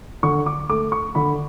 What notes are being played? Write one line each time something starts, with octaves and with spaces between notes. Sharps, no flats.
D3 C#6
D6
A3 D6
C#6
D3 B5